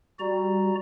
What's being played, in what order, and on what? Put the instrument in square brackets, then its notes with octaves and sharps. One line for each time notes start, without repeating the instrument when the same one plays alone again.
[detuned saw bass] G3 [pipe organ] F#4 D5 A#5